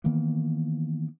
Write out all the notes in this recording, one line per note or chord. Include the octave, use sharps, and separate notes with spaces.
D#3 E3 A#3 B3